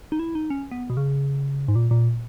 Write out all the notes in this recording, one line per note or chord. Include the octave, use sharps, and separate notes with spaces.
D#4
E4
D#4
C#4
B3
B2
C#3
G#2
A#2
A#2